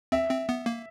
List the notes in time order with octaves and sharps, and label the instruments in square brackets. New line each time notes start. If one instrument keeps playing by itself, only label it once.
[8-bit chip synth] C4 [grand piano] E5
[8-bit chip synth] C4
B3
A#3